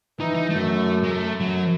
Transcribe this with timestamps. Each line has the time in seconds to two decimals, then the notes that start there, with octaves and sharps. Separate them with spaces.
0.19 E3 D#4
0.34 D#4
0.50 F#2 A3
1.03 G#3
1.11 A3
1.40 F#2 F#3